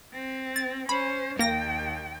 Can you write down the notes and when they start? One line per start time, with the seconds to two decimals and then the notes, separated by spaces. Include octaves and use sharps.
0.13 C4
0.56 A6
0.89 C#4 C5 B5
1.39 D#2 A#3 G5 A#6